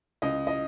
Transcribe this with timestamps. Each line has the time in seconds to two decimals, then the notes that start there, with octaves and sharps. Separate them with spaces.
0.22 C#2 D#5
0.47 D#5